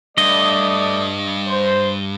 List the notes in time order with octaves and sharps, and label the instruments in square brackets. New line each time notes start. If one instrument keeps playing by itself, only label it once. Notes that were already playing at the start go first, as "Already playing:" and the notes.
[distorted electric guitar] G2 [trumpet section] A3 D5 D#6 [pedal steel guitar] D#5
[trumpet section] C5